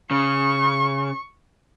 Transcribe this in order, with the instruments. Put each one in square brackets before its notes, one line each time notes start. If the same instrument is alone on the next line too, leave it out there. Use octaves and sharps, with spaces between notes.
[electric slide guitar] C#3 [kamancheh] C#6